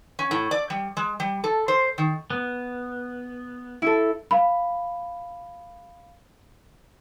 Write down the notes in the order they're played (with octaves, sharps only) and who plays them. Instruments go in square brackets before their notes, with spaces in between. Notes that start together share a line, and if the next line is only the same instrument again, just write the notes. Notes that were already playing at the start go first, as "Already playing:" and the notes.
[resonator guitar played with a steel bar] C#4
A2
D5
G3
G#3
G3
A4
C5
D#3
[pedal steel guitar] B3
[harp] E4 A4
[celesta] F5 B5